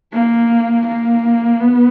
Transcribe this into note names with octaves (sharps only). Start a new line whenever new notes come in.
A#3
A#3
B3